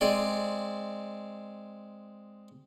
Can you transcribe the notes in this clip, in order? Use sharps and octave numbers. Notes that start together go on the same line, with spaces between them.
G#3 C4 G#4 D5